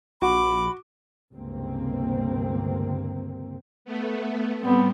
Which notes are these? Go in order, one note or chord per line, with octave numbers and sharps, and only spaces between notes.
A#1 F#4 B5 D6
G1 C#2 C3 A#3 C4
A3 B3
A2 G3 B3 C4